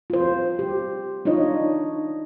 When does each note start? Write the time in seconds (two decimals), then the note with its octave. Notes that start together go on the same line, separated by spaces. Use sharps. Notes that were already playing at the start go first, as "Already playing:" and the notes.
0.10 F4 C5
0.59 G4
1.25 D4 D#4 F4 C#5 D#5